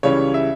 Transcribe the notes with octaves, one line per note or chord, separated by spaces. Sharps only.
C#2 C#3 E3 G3 C#4 C#5
E5